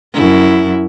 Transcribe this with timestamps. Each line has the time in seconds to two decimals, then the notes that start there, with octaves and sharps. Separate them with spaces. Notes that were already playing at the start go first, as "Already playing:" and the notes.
0.13 F#2 E4